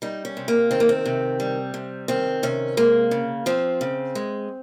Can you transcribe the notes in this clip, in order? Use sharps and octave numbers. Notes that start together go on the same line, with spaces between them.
G3 D#4
C#4
C3
A#3
D#3 C4
A#3
C4
C3
G3
C3
D#3 C4
C3 C#4
G#3 A#3
C#3
F3 C4
C#3
G#3